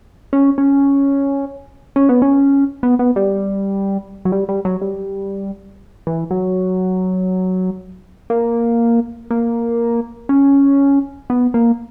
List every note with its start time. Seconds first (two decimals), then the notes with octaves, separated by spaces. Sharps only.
0.33 C#4
0.58 C#4
1.96 C#4
2.09 B3
2.22 C#4
2.83 B3
2.99 B3
3.16 G3
4.25 F#3
4.32 G3
4.49 G3
4.65 F#3
4.81 G3
6.07 E3
6.31 F#3
8.30 A#3
9.31 A#3
10.29 C#4
11.30 B3
11.54 A#3